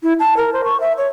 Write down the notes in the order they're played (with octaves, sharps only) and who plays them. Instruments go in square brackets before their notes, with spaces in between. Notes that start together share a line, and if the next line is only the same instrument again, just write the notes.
[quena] E4
A5
A#4
C5
C#6
E5
C#5